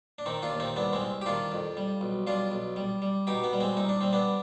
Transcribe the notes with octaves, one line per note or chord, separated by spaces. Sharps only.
D4
D#3 C4 D#4
D4 F4
D#2
C4 D#4
C2 B3 D4
G#3 C4
C2
G4
D#3 D4 F4
F2
G3
B1
G3 D4 F4
B1
G3
G3
B2 D#4 G4
B3
G3
G#3 C4
C2 D#4
D4
G3 C4
B3 D4